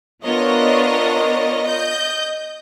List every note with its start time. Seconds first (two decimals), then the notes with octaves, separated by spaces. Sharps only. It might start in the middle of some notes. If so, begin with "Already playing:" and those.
0.24 B3 D4 F4 A#4 C#5 D#5
1.65 D#5 G6